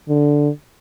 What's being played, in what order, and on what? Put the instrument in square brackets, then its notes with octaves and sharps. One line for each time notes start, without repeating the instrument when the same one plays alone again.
[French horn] D3